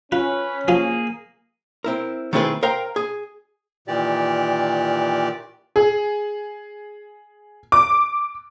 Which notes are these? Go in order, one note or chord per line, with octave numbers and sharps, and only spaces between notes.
C#4 F4 B4
F3 A#3 F4 G#4
C4 E4 A#4
D#3 A3 C4 E4 G#4 B4
A#4 C5 F5 G5 A#5
G#4
A#2 D#3 E3 G4 D5
G#4
D6